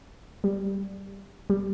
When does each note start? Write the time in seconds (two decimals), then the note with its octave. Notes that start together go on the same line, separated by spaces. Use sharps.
0.44 G3
1.50 G3